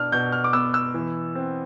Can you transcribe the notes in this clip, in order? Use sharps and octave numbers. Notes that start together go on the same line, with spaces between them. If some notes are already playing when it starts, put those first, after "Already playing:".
Already playing: B2 D4 F6
B2 G6
F6
D6
B3 E6
E6
E3
C4